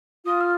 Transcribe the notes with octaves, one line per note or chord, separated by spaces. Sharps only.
F4 D#6
F6